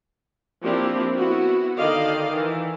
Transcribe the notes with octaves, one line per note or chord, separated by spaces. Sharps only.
F3 A#3 C4 D4 E4 G4
B3 E4 F#4
D3 D#3 D5 D#5 F5
D#3 E3